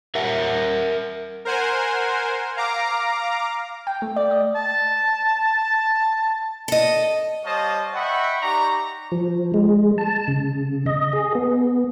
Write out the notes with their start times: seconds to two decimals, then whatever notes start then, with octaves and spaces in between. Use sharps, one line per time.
0.15 A#4 E5 F#5
1.45 A#4 C5 F#5 G#5
2.57 F5 A#5 D6
3.87 G5
4.02 A3
4.16 D5
4.31 D#5
4.56 A5
6.68 A4 D#5
7.44 G3 C5 C#5 D#5 F5 A5
7.94 D#5 E5 F#5 G5 B5 C#6
8.42 D#4 G4 D5 A#5 C#6
9.12 F3
9.54 G#3
9.98 A5
10.28 C#3
10.86 D#5
11.13 G#4
11.35 B3